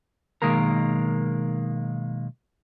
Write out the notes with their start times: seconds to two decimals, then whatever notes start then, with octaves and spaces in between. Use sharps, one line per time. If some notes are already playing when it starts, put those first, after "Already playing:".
0.42 B1 F2 D#3 G#3 A#3 A#4